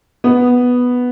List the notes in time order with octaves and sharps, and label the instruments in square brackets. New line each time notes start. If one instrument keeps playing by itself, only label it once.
[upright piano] B3